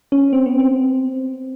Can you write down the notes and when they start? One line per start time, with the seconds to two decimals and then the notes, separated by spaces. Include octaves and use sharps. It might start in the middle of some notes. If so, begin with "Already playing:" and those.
0.12 C#4
0.33 C4
0.46 B3
0.60 C4